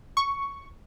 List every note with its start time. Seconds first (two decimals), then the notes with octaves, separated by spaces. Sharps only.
0.17 C#6